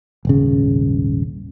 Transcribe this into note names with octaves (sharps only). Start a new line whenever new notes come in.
D#1 G#1 C#3